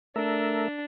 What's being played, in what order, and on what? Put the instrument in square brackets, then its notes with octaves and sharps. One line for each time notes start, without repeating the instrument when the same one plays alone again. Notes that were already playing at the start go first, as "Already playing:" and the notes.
[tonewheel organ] A3 A#4 E5 [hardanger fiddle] D4